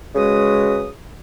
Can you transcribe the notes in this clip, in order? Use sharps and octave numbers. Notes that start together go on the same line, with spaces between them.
C#3 G#3 F#4 B4 D#6